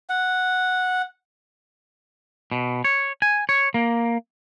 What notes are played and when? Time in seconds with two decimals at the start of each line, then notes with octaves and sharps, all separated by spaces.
0.09 F#5
2.52 B2
2.84 C#5
3.22 G#5
3.49 C#5
3.74 A#3